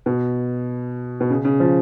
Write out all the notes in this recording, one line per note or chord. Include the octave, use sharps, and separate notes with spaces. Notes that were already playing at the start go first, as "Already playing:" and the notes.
B2
B2
C#3
C#3
F3